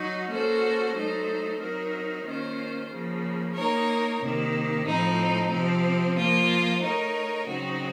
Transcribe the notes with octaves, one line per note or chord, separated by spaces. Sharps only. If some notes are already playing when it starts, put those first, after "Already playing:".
Already playing: F#3 D#4 F#4
A#3 C#4 F#4 A4 C5
F#3 A3 D#4 A4 C5
F#3 C4 D#4 A#4
D#3 A#3 C#4 F4 C5
C#3 F3 A#3
A#3 D#4 A#4 C#5
C3 D#3 A#3
A2 F3 C4 D#4
C3 F3 C4
F3 A#3 F4 C5
A3 D#4 A#4 C#5
C#3 F#3 C4 D#4 F#4